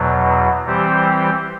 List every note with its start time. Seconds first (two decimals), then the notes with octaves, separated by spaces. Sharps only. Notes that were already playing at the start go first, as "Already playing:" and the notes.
Already playing: E2 B2 F#3
0.65 E3 G3 C4 G4 C5